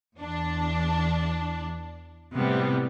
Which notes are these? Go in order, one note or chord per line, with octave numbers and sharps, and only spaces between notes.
E2 D4
A2 C3 G3 B3